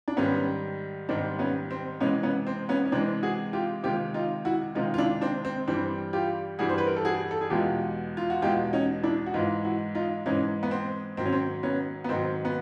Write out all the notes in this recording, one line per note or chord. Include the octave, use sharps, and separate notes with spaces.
D4
G#2 D#3 G3 B3 C#4
G#2 D#3 G3 C4 D4
B3 C#4
C4
C3 E3 G#3 B3 C#4
B3 C#4
C4
B3 C#4
C#4
C3 E3 G#3 C4 D4
F#4 G#4
F4 G4
C3 D#3 G#3 F4 G4
D#4 F4
E4 F#4
C3 D#3 G#3 D#4 F4
F4
D4 E4
C4 D4
C4
G2 E3 G3 C4 D4
F4 G4
G2 E3 G3 F#4 G#4
C5
B4
A#4
A4
F#4 G#4
A4
G#4
E2 B2 G#3 F4 G4
F4
F#4
E2 B2 G#3 F4 G4
C#4 D#4
D4 E4
F#4
G#2 E3 G#3 D#4 F4
E4 F#4
D#4 F4
G#2 E3 G#3 C#4 D#4
B3
C4
G#2 D#3 F#3 C4
C#4
C4
B3 C#4
B3
G#2 D#3 F#3 C4
B3